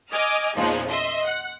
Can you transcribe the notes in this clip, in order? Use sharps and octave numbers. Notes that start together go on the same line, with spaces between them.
D#5 G#5 D6 F6
E2 A#2 C#3 F3 G#3 D#4
D#5 E5 C6
F#5